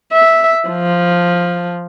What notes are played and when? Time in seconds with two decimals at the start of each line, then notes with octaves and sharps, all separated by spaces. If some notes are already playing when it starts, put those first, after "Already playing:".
0.13 E5
0.69 F3